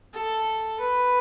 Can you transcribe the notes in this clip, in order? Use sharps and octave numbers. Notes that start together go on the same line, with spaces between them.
A4
B4